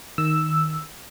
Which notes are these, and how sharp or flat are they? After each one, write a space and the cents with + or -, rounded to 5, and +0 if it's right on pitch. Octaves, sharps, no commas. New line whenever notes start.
D#3 +0 E6 +0